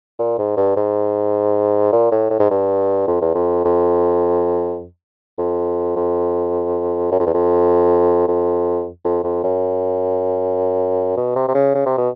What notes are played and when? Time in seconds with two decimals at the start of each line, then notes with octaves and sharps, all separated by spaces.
0.19 A#2
0.38 G#2
0.57 G2
0.76 G#2
1.92 A#2
2.11 A2
2.30 A2
2.40 G#2
2.50 G2
3.07 F2
3.21 E2
3.35 F2
3.65 F2
5.38 F2
5.96 F2
7.11 F#2
7.20 F2
7.26 E2
7.34 F2
8.28 F2
9.05 F2
9.24 F2
9.44 F#2
11.17 B2
11.36 C3
11.48 C3
11.54 C#3
11.75 C#3
11.86 C3
11.98 B2